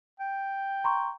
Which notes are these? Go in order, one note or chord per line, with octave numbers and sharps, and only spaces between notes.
G5
A#5 C6 C#6